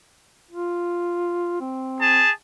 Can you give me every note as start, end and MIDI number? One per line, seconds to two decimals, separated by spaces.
0.51 1.56 65
1.60 2.22 60
2.01 2.31 68
2.01 2.31 81